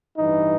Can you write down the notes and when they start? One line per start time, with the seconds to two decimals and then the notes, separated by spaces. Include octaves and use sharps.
0.18 A1 G2 E3 D#4